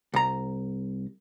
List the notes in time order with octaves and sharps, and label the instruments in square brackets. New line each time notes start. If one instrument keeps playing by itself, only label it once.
[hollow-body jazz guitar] C2 A#5